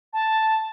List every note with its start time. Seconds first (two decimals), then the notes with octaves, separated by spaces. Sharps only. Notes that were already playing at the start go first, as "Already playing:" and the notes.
0.13 A5